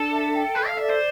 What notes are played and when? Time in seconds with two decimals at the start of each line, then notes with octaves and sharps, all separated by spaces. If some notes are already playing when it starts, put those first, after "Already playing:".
Already playing: D4 A4
0.13 E5
0.34 G5
0.56 A4 B4
0.67 F5
0.78 D5 E5
0.90 C5